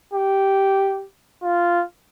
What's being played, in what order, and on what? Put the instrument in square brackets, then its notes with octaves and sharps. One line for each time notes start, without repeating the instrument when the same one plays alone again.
[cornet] G4
F4